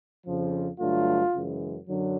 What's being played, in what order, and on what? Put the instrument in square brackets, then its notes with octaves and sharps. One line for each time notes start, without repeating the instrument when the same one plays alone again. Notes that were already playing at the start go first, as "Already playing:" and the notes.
[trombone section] F2 C#3 F3
G2 D3 F#3 A3 F4
F#2 C#3 E3 G#3
F#2 D3 F#3